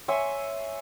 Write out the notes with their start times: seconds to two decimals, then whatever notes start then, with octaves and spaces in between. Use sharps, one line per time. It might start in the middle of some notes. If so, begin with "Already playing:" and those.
0.08 C#5 E5 G#5 C6